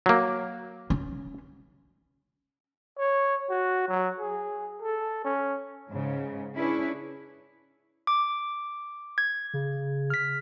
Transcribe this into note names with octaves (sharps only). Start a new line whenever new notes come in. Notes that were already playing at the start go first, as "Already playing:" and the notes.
F#3 A#3
C#4
C#5
F#4
F#3
G#4
A4
C#4
G#2 C#3
C#4 D4 E4 G#4 B4 C#5
D6
G#6
C#3
F6 B6